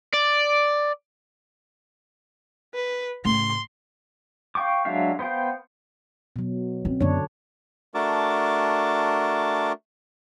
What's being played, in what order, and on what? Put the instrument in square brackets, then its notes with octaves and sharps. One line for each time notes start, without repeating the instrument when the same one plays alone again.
[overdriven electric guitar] D5
[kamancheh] B4
[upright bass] A2 C#3 [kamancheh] C6
[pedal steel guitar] F5 G5 C#6 D6
F#3 G#3 D4 E5 F5
B3 C5 F5 G5
[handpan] B2 F#3
[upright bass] C4 C#4
[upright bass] F#2 B3 [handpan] D3 D4 C#5
[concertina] A3 D4 F#4 A#4 A5 D6